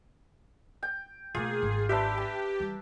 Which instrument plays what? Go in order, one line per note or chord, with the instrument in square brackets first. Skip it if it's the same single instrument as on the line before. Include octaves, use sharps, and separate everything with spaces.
[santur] G5
[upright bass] B2 A3 [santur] A#3 F4 [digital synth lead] G#4
[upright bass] G#1
[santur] D4 B4 E5 [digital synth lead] G4
[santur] A5
[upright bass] E3 G3